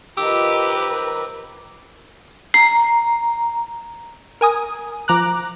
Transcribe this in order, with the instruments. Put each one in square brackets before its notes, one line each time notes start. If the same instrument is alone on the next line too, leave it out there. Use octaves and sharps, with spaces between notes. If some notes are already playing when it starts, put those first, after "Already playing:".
[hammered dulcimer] D#3 F3 [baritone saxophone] G4 [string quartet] A#4 B4 [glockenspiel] D6 E6
[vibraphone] A#5 [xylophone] C7
[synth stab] A#4 G#5 D#6
F3 A#5 D6 F#6